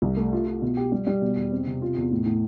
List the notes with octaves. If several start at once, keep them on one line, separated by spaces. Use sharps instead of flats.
C2
A3
F4
F4
B2
G4
G3
G3
B2
E2
C4
C3
F4
E2
A2
A2